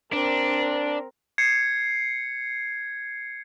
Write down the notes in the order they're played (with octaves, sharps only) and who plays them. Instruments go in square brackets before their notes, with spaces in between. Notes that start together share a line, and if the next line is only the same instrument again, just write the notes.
[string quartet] C4 A#4 [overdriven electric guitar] D4
[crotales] G#6 C7 C#7